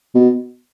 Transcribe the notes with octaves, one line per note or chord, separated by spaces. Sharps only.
B2